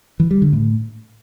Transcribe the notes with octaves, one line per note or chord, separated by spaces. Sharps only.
E3
G3
D3
A2